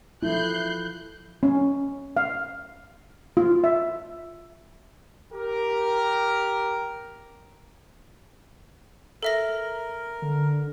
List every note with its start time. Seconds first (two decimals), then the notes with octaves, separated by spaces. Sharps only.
0.23 F3 E4 A4 F#6 G6 C7
1.43 C#4
2.17 F5
3.37 F4
3.64 E5
5.33 G4 A#4
9.23 A4 A#4 E5 A#6
10.22 D3